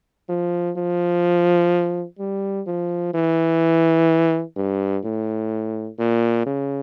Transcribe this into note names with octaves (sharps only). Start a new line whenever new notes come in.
F3
F3
G3
F3
E3
G2
A2
A#2
C#3